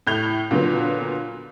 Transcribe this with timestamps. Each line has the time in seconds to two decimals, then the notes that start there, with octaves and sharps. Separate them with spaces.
0.07 A2 G6 F7
0.51 A#2 D3 F#3 B3